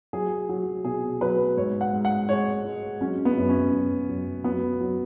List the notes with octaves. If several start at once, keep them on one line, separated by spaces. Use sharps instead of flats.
F#3 G#4
F#3
B2 G#4
F#3 B4
G#2 C#5
F#5
G#2
F#5
G#3 C#5
G#3
F#3 C#4
B3
F#2
C#4
F#2
F#2
F#3 B3
F#3